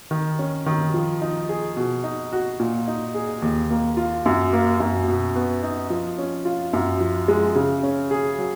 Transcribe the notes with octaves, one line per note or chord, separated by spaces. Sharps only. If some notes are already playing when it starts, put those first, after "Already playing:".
D#3
C#4
D#3
F3
D#4
G#4
B2
D#4
F#4
A#2
D#4
G#4
D#2
A#3
F4
F#2
A#3
F#2
B2
B3
D#4
F3
C#4
F4
F#2
F3
G#3
C#3
C#4
G#4
F#3